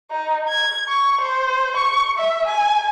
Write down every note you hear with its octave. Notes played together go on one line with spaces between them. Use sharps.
D#4
G#6
C#6
C5
C#6
E5
G#5